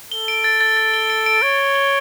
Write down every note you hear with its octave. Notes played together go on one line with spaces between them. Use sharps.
A4 G7
D7
A6
A6
A6
G7
D7
D7
C#5 D7
A6
G7